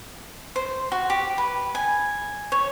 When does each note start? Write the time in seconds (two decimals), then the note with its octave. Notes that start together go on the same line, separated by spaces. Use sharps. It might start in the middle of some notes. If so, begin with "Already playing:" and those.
0.56 C5
0.92 F#4
1.10 G4
1.38 B4
1.75 G#5
2.52 C#5